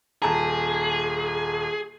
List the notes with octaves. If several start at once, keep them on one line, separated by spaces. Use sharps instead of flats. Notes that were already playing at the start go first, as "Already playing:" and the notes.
D#1 G#4 A5 A#5